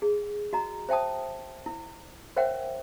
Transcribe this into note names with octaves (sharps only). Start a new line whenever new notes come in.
G#4
F#4 D#5 A#5
C5 E5 G5 A5 D#6
E4
A#4 C5 C#5 E5 F#5 G5